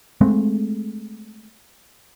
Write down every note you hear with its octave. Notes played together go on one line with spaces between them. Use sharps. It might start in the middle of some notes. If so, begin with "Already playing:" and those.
G#3 A3 C4